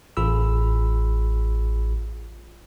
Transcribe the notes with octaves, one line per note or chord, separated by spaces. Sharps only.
A1 F4 G#4 B5 E6